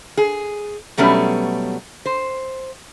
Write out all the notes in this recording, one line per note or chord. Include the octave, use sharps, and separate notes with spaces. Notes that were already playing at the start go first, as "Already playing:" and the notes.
G#4
B2 F#3 G3 A3 B3 C#4
C5